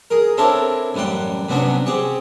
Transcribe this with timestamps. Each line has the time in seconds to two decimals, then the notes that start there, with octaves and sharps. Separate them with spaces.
0.10 G#4 A#4
0.38 C4 D4 E4 A4 A#4 C#5
0.94 A1 F#2 G3 F#5 G5
1.49 C3 F#3 B3 C#4 D4
1.86 C4 G4 G#4 C#6